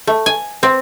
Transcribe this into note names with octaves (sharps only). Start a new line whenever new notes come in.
A3
G#5
C4